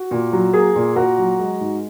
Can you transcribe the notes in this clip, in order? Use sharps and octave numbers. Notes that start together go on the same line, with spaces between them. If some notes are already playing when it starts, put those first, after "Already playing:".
Already playing: F#4
A#2
F#3
A#3 G#4
A#2
A#2 F#4 A#4
F#3
G#3
G#2